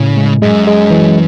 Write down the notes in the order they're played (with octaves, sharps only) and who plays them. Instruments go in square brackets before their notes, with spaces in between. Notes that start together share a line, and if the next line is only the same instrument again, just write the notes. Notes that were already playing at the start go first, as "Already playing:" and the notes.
Already playing: [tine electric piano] A2 [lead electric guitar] C#3
[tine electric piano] G#3
[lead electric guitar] F#2 [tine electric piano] G#3
[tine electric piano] G#3
E3